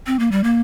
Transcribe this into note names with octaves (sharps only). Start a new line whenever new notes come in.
C4
A#3
G3
A#3